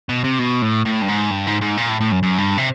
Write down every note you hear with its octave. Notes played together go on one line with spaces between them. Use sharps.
B2
C3
B2
A2
A2
G2
G#2
G2
G#2
G#2
A#2
A2
A2
F#2
F#2
G2
C3